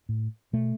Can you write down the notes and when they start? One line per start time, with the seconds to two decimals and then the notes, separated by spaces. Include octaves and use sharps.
0.09 A2
0.53 B2 A3